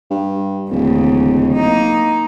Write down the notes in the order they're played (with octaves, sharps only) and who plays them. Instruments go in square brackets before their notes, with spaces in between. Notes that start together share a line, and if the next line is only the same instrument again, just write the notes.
[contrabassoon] G2
[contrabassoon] D1 [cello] D#2 C#3
[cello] A#3 D#4